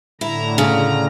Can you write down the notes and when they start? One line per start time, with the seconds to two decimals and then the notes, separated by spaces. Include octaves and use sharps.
0.21 A2 D3 E4 A#5
0.58 C#3